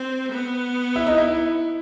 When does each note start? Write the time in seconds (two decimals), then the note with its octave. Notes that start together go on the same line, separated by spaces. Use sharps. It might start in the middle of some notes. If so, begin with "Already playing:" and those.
Already playing: C4
0.32 B3
0.96 E4
1.07 D#4
1.18 E4